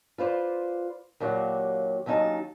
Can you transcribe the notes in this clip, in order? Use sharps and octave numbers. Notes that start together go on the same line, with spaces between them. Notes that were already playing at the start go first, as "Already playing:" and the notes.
F4 B4 C5 D5
D#2 A#2 F#3 G4 C#5 F#5
D#2 F#3 C#4 D#4 A5